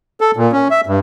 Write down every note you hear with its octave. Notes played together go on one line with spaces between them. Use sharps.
A4
A#2
C#4
E5
G2